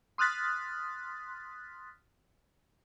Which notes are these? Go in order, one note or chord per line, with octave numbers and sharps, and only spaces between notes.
C6 D#6 F6 F#6 A6 B6